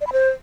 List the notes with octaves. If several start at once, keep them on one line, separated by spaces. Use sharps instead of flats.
D5
B5
C5